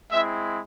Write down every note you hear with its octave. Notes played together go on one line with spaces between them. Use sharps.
G#3 C4 E4 E5